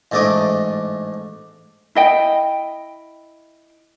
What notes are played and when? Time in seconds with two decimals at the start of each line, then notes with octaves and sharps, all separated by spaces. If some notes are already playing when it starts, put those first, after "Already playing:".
0.12 A1 G#2 A3 D4 D#5 D6
1.95 E4 D#5 G5